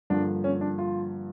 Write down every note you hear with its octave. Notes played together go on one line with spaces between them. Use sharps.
G2 D3 F3 A#3 D4
C#4
D4
F4